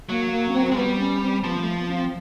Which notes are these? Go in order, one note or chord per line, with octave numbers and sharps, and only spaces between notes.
F#3 A#3
A#3
C#4
C4
C4
G#3
G3 B3
C#4
C4
F3 B3
A#3
A3
B3
C#4
C4